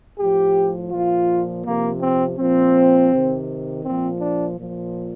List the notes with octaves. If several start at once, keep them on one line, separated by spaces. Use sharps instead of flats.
A2 F3 G4
A#2 F3 F4
C3 F3 A#3
C4
A#2 F3 C4
C3 D#3
A#2 F3 C4
D4
A#2 F3